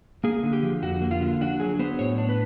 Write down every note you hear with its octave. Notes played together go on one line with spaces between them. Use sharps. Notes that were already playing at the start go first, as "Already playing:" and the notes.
A#3 G#4
D3
G4
F3
F2 F#4
A#3
F4
D3
D4 F#4
F#3 G#4
B3 C5
A2 C#5
D4
B4